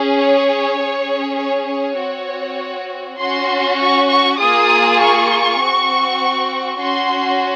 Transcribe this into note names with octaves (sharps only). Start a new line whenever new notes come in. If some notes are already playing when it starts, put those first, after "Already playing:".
Already playing: C#4 G#4
C#5
C#4 G#4
C#5
C#5
C4 F#4
C#4 F#4 C6
C#6
C#6
A#3 F4 G#4 D#6
C#6
C4 F#4
C#4 F#4 C6